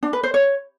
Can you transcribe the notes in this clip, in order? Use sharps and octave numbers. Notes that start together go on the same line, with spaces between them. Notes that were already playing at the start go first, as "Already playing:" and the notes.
D4
B4
C5
C#5